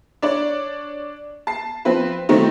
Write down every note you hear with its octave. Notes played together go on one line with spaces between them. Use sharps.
D4 C#5 D5
A5 C7
F3 C4 B4
D#3 E3 F#3 A3 C4 D#4